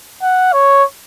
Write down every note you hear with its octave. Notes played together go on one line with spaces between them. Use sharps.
F#5
C#5